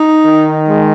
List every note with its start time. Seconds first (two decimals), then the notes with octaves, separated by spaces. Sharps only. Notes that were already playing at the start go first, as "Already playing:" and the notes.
Already playing: D#4
0.25 D#3
0.68 G#3